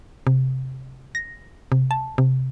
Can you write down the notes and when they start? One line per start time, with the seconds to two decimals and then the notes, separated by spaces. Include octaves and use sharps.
0.27 C3
1.15 A#6
1.72 C3
1.91 A5
2.18 C3